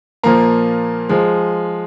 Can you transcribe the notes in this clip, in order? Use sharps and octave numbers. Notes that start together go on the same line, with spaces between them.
A#2 F3 A#3 A#5
F3 G#3